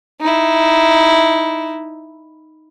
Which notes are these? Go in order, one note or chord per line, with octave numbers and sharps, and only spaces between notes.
D#4 E4